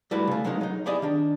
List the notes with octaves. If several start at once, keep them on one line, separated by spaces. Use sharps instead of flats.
G3 A3 E4 F#4 B4
C#3 A3
F#3 G#3 A#3 C#4 D#4
F#3 D#4
E4 G4 G#4 D5 D#5
D#3 D4